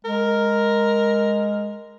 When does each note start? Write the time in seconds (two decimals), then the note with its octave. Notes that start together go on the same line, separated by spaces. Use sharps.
0.05 G#3 A#4